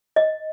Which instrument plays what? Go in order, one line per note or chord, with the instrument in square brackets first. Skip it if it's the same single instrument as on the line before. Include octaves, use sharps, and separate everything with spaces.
[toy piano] D#5